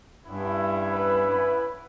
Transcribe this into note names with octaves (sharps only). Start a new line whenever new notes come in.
G2 B3 C#4 E4
B4